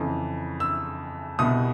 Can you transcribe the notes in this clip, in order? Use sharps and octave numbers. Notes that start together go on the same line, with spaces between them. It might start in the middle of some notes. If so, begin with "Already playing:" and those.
Already playing: F2 C#3 E3
E6
C2 B2 G3 D#6